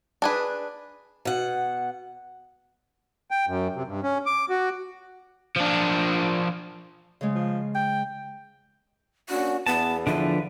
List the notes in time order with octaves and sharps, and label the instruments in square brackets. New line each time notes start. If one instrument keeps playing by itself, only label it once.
[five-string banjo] D4 G#4 B4
[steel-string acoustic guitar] B2 F#5
[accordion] G5
F#2
C3
G2
C#4
D6
F#4
[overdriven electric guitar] F3 D4
[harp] C#3 G#3
[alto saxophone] F3
G5
[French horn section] A#3 C#4 D4 [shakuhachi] F#4
[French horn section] E2 [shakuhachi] B3 [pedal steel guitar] A5
[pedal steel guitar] D3 F3 B4 [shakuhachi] E5